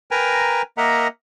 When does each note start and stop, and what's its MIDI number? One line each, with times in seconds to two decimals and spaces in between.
0.11 0.62 70
0.11 0.62 71
0.11 0.62 79
0.11 0.62 80
0.11 0.62 82
0.78 1.08 58
0.78 1.08 70
0.78 1.08 75
0.78 1.08 76
0.78 1.08 78
0.78 1.08 82